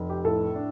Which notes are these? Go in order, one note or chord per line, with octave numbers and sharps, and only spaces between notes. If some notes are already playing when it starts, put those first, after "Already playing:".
Already playing: F1
G4
A2 A4
D4